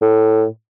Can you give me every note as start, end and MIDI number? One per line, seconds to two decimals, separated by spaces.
0.02 0.45 45